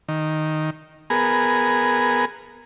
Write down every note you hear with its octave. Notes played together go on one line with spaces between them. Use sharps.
D#3
B3 G#4 A#4